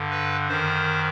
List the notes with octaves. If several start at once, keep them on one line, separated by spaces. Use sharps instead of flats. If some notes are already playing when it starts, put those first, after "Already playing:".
Already playing: G2 D3
B4
F#2 D#3 C5